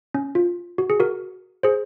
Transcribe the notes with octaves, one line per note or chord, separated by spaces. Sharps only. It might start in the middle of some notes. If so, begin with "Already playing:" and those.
C#4
F4
F#4
G#4
F#4 A#4
G#4 C5